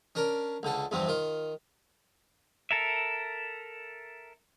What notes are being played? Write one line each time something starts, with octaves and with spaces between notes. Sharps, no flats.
C#4 D4 A#4
C#2 D3 A4
E2 G2 C3 F3 C4
D#3 F4
A4 A#4 E5